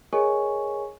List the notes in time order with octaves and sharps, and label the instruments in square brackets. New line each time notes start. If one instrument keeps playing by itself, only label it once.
[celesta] G#4 A#4 C#5 D#5 G#5 C#6